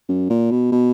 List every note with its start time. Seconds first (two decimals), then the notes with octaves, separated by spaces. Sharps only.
0.08 F#2
0.30 A#2
0.51 B2
0.72 B2